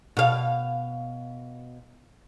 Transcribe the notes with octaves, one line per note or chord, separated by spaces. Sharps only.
B2 F5